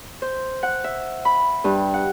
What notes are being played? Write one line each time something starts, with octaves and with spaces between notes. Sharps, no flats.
C5
F#5
E5
B5
G2
F#5